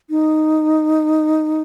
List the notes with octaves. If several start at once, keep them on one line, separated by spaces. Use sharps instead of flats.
D#4